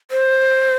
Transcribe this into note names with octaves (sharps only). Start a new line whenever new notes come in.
C5